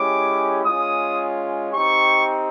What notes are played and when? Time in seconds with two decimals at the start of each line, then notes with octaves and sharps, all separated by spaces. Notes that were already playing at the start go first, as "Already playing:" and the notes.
Already playing: G#3 C#4 E4 G4 D6
0.64 G#3 C#4 F4 D#6
1.73 C4 D#4 G4 C#6